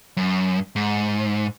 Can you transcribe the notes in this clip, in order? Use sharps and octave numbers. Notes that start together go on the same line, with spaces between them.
F#2
G#2